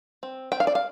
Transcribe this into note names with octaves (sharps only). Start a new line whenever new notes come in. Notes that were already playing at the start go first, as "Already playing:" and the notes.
C4
C4 G5
F5
D5
F5